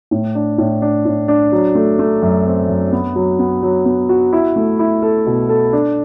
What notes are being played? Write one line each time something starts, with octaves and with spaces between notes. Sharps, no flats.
A2
D4
A2
D4
A2
D4
F#3
A3
A3
F#2
C4
F#2
B3
F#3
B3
F#3
B3
F#4
E4
A3
E4
A4
B2
A4
D4